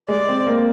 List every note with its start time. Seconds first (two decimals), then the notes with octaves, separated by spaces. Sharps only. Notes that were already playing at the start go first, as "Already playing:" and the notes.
0.08 G#3 D5
0.28 C4
0.47 A#3